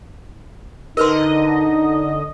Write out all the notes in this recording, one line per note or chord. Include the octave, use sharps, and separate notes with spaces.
D3 D#4 A#4 B4 D#5 C6